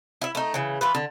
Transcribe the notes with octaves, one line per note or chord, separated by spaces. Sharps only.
E4 E5
A3 D#4
C#3 E3
E3 F4 B4
D3